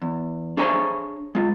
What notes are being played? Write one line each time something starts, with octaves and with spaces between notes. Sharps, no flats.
E2
D4 G#4 C5 C#5 G#5 A#5
G#3 F4